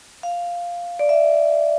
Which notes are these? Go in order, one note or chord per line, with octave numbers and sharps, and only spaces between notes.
F5
D5
E5